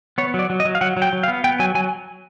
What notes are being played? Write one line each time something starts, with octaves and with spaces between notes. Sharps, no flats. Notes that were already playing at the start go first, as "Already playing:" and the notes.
B3 C#5
F#3 D5
F#3
D#5
F#3
F5
F#3 F#5
F#3
G5
F#3
F5
B3
B3 G5
F#3 G#5
F#3 G#5